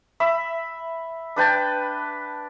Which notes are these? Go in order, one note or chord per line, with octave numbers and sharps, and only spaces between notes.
E5 B5 E6
D4 B4 G5 A5